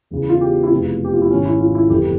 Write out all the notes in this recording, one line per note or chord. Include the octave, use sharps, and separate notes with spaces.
E1 E2 C#3 E3
F4
G4
E4
F1 E2 C3 E3 F4
G4
F4
E4
G#1 G#2 E3 C#4
E4
F4
E4
G1 F2 E3 G4